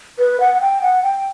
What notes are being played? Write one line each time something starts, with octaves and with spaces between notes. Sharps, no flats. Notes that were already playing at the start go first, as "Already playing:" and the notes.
B4
F#5
F#5
G5
F#5
G5